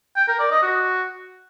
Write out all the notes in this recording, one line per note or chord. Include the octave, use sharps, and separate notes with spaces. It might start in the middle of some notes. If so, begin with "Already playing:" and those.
G5
A#4
D5
D#5
F#4